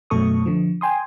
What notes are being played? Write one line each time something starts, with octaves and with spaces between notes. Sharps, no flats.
F#2 B2 A3 A4 C#6 D#6
D3 F3
G5 G#5 C6 D#6